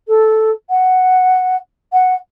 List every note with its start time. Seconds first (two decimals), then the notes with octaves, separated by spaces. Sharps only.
0.07 A4
0.69 F#5
1.92 F#5